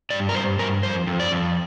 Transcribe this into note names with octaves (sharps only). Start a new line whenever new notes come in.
G2 D5
A#4
G2 C5
G2 A#4
F2 C5
F2
D5
F2